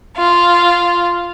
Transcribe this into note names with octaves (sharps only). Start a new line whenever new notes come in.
F4